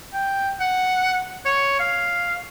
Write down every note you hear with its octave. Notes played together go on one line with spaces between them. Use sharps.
G5
F#5
C#5
F5